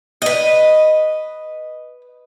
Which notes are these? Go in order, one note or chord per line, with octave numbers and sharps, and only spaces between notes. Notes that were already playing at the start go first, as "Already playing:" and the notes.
B4 D#5